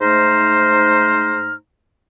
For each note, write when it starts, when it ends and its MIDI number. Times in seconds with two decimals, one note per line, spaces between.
0.01 1.54 44
0.01 1.54 57
0.01 1.54 63
0.01 1.54 72
0.01 1.54 82
0.01 1.54 89